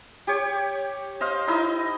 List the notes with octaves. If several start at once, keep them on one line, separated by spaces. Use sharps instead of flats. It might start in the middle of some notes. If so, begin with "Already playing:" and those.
G4 C#5
C5 D#5 F5
D#4 E4 D#5